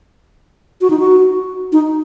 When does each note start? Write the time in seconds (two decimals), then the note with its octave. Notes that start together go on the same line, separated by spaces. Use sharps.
0.81 F#4
0.90 D#4
0.99 F#4
1.72 D#4